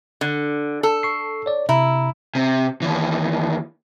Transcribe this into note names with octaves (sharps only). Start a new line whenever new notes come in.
D3
A4
C#6 C7
C#5 D5
C3 E4 A#5
C3
D#2 E3